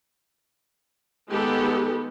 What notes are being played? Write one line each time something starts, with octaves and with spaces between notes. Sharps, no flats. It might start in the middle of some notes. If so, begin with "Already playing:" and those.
D#3 G#3 B3 G4 A4